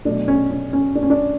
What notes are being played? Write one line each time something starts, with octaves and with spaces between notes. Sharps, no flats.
B2 F#3 A3 D4
C#4
C#4
C#4
D4
C#4
D4